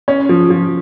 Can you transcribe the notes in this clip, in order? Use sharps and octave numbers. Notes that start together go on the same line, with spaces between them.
C#4
F3
F3